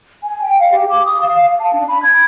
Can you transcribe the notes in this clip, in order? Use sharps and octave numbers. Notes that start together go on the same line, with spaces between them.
G#5
G5
F5
G4
D6
D#6
F5
F5
A5
D4
B5
G#6